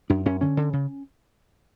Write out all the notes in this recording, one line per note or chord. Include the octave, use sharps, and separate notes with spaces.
F#2 D4
F#2 C#4
D3 C#4
D3
C#3